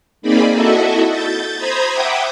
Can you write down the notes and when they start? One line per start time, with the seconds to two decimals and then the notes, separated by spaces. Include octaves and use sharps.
0.22 A#3 C4 D#4 G#4 D5 B5
0.52 E4 F#4 A4 D#5 E5
1.09 G6 A6
1.56 C5 A#5 B5 D#6 G#6
1.91 E5 F#5 G5 D6 D#6